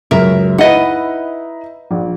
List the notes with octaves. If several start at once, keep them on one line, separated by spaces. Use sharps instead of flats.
C#2 F#2 A#4 E5
D#4 E4 B4 D#5 E5 F#5
A#1